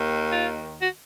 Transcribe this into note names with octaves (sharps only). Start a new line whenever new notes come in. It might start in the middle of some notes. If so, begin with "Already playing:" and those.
Already playing: D#2 D#3
F4
F#4